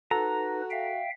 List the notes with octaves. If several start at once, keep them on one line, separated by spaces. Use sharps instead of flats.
D#4 F#4 A4 B4 A#5
E5 F5 G5